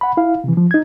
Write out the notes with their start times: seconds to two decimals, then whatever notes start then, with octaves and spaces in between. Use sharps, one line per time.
0.01 F#5 B5
0.17 E4 F5
0.44 C3 E3
0.57 F3
0.71 D#4 G#6